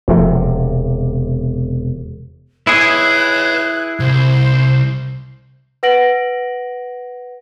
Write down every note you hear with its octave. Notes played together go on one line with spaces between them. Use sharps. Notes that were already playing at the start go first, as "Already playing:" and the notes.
E1 C3 F3 A3
E4 G#4 B4 C#5 F#6
C2 C5
B4 F#5 A#6 D7 F#7